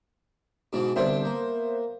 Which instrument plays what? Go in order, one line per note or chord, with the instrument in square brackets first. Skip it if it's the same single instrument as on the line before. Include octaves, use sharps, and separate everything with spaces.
[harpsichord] G#2 B2 E3
[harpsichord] C2 D3 D4 [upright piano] B3 C5 E5
[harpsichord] A#3